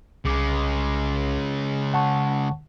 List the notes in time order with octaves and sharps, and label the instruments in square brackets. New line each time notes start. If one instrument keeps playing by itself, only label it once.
[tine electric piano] C2 D6 [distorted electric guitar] C#3 G#3
[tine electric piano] F#5 A5 C#6